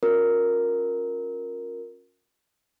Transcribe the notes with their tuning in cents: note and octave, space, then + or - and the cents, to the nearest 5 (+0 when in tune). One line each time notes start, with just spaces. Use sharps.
C#4 -5 F4 +45 A#4 +0